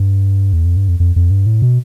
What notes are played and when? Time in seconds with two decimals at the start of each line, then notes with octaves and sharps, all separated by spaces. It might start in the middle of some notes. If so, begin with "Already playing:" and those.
Already playing: G2
0.53 E2
0.65 F2
0.77 G2
0.88 F2
1.00 F2
1.16 F2
1.31 G2
1.46 A2
1.62 B2